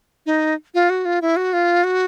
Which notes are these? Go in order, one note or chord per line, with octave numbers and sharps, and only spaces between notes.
D#4
F4
F#4
F4
E4
F#4
F4
F#4